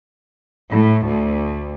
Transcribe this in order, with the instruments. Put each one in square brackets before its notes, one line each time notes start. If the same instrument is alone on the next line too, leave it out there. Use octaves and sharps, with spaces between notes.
[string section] A2
D2